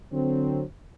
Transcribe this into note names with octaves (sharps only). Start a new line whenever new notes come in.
D3 F#3 C4